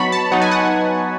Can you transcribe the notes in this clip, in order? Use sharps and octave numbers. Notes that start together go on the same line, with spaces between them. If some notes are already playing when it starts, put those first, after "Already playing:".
Already playing: F#3 B3 D#4 A5 B5 C#6
A5
F#3 B3 D#4 F#5
G#5
F#5